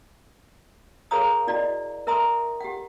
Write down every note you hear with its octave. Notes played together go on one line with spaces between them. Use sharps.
G#4 A#4 C#5 F5 A#5 D#6
E4 F#4 D5 D#5
A#4 E5 A#5 C6 D#6
G4 F#5